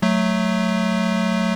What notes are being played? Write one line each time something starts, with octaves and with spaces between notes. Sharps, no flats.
F#3 A3